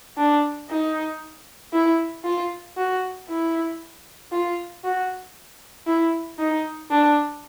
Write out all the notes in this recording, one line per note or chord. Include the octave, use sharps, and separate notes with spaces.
D4
D#4
E4
F4
F#4
E4
F4
F#4
E4
D#4
D4